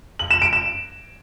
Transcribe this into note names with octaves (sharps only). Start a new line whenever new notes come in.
F#7
E7
D7
E7